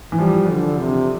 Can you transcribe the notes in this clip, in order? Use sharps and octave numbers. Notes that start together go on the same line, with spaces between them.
E3
F3 G3
D3
C3